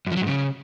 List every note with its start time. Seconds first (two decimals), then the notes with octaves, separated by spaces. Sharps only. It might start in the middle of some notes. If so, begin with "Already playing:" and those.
0.07 F#2
0.12 F3
0.17 F#3
0.22 G#2
0.27 C#3